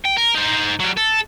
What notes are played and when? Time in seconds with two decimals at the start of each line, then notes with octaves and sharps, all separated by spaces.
0.05 G5
0.17 A#4
0.34 D#4 C5
0.80 F#3 G3
0.97 A4